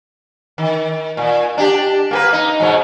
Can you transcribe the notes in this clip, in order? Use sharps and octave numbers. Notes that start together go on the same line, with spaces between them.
D#3
A#2
D4 G4
A#3 G4 B4
D#4
G#2 B2 F#3